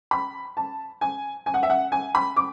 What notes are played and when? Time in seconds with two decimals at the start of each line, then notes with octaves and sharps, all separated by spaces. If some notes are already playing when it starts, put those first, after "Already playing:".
0.11 B5
0.57 A5
1.01 G#5
1.46 G#5
1.54 F#5
1.63 E5
1.70 F#5
1.92 G#5
2.15 B5
2.36 D6